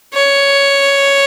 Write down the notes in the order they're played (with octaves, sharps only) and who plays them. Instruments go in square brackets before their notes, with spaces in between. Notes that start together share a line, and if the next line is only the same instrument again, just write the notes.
[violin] C#5